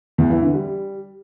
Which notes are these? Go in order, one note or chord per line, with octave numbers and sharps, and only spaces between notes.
E2
E3
D3
G3